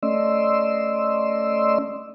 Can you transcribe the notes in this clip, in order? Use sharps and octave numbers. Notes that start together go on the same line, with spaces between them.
A3 C#4 D5 D#5 C6 E6